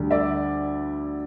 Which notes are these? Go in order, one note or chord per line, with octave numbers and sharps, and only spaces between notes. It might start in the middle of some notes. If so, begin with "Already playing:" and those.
Already playing: D2 D3 G3
D5 E5